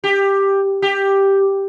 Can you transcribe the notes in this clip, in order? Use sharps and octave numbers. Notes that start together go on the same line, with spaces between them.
G4
G4